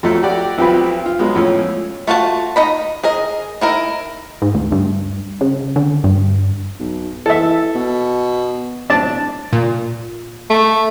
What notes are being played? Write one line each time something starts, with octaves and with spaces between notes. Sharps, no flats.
F2 F3 F#3 A3
F#4 G4 D5
B1 F3 C4 G4 B4
F4
F#3 G#3 B3
F2 A2 C#4
A3 F4 F#4 A5
D#4 D#5 B5
G#4 A#4 D#5
D#4 E4 A#4
G#2
D2
G2
C#3
D3
G2
B1
E3 A4 E5
B2
D1 D4 A5
A#2
A3